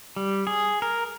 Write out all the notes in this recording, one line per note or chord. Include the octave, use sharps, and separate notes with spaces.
G3
G#4
A#4